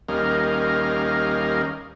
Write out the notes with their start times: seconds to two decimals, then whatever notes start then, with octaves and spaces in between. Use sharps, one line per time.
0.08 D#2 G3 C#4 A#4 D#5 F5